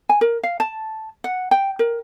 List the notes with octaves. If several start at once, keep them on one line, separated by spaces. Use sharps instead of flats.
G#5
A#4
F5
A5
F#5
G5
A#4